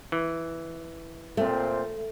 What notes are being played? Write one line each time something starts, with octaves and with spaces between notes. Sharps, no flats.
E3
A#2 A3 C4